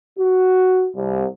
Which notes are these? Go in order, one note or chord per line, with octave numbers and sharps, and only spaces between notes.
F#4
C2